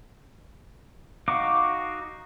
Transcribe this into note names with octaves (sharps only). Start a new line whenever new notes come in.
D#4 F#4 F5 D6